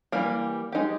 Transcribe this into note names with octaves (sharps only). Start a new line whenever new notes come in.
E3 G3 A#3
G#3 D#4 G4